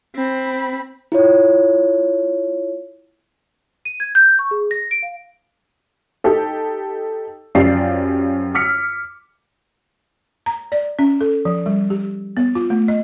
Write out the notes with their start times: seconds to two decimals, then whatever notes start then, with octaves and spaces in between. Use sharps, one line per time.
0.15 C4 B5
1.12 E4 F4 C#5
3.85 D#7
4.00 G#6
4.15 G6
4.39 C#6
4.51 G#4
4.71 A#6
4.91 D7
5.03 F5
6.24 D#4 G4 A4
7.55 F#2 F3 F4 G4 D5 C7
8.55 D6 E6 F6 B6 C#7
10.46 A#5
10.72 D5
10.99 C#4
11.21 A4
11.45 F3
11.66 G3
11.90 G4
12.37 B3
12.55 F4
12.70 A3
12.88 D#5